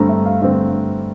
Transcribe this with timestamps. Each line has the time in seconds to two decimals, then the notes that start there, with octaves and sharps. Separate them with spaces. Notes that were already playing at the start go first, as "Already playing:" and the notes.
Already playing: G2 D3 A3 C4 A#5
0.09 E5
0.26 F5
0.41 G2 D3 A3 C4 F5